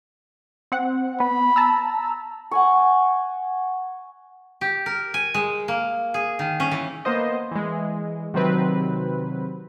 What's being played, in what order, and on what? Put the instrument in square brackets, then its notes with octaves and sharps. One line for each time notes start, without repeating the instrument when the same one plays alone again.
[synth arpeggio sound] C4 F#5
[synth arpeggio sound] B3 [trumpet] B5
[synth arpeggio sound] A5 A#5 E6
[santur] F#5 G#5 C#6
[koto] G4
A#4
G#5
G#3
A#3
G#4
D#3
C#4
E3
[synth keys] A#3 B3 C5 D#5
E3 G#3
C3 D#3 F#3 C4 B4